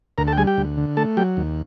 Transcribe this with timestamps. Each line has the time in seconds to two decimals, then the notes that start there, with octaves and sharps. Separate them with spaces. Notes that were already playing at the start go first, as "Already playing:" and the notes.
0.18 D2 A#4 A#5
0.27 A4 A5
0.33 G5
0.38 G3 G#4 G#5
0.47 G4 G5
0.58 D2
0.77 D3
0.97 A3 A4 A5
1.17 F#3 G4 G5
1.37 D#2